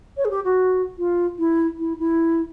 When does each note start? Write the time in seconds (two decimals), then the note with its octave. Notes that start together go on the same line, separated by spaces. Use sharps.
0.17 C#5
0.25 G#4
0.31 G4
0.44 F#4
0.98 F4
1.39 E4
1.79 E4
1.99 E4